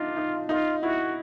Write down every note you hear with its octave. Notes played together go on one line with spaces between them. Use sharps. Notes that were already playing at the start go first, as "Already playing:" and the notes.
Already playing: D4 D#4 F4
D#4
D#4 F4
E4 F#4